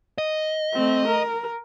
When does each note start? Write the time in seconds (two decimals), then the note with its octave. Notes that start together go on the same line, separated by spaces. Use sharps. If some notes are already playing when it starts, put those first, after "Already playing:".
0.18 D#5
0.73 A3 C4
1.07 A#4